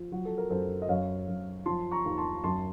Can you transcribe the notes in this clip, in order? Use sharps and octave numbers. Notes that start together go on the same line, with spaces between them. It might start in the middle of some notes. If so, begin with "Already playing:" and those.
Already playing: F3
F#3 F#4
A4
A#4
F#2 A4 C5
D#5
F#2 C#5 F5
F#2
F3 A5 C6
A#5 C#6
D#2
A5 C6
F#2 A5 C6